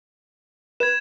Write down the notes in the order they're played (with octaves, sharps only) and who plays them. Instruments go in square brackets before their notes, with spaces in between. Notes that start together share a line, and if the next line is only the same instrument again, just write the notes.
[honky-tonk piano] B4 [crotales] G#6 E7